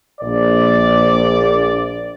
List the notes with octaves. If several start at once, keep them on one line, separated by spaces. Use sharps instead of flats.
A#1 D5